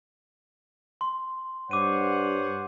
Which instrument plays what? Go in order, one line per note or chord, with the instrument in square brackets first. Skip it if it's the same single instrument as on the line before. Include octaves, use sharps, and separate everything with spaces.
[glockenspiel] C6
[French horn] G2 [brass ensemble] C5 C#5 F#5 [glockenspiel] D6 D#7